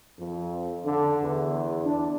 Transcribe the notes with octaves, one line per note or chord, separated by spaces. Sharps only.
F2
D3
E2
D4